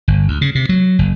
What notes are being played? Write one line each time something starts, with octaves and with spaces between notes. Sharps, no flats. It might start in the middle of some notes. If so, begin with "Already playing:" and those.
G1
D2
C#3
C3
F#3
F#1